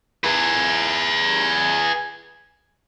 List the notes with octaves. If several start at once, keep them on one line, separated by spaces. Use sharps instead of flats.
G#4 B4